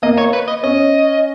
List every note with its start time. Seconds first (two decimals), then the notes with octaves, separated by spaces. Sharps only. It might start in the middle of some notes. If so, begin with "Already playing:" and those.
0.03 A#3 D#5
0.18 C#5
0.33 B4
0.48 D#5
0.63 C#4 D#5